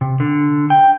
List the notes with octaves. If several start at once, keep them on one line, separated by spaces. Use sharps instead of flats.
C3
D3
G5